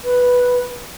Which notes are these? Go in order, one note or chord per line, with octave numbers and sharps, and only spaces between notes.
B4